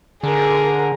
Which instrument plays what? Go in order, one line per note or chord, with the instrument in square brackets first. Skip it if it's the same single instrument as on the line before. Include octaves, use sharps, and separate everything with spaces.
[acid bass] D3 [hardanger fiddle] G#4 A#4